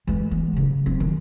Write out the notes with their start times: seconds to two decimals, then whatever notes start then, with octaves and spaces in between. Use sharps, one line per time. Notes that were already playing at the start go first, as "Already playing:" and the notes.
0.07 E3 G#3
0.31 B3
0.53 C#3 F#3
0.86 C4
1.00 D#3